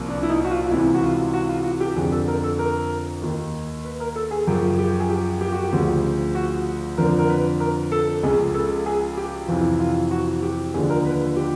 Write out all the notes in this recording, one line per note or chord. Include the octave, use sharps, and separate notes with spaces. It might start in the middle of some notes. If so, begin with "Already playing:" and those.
Already playing: C2 A#2 F3
D4
E4
D#4
F#4
F4
C#2 C3 E3 E4
F#4
F4
F4
F#4
F4
F#4
G4
F2 D3 F3 G#4
A4
A#4
A4
A#4
D#2 D#3
B4
A#4
A4
G#4
F#2 C#3 F3 G4
G4
G#4
G4
G4
F#4
G4
D2 C#3 F3
F#4
F2 D3 F3 A#4
A#4
B4
A#4
A4
C#2 C#3 F3 G#4
A4
G#4
G4
F2 C3 E3 F4
F4
F#4
G4
D#2 D3 F3 G#4
A#4
B4
B4
G4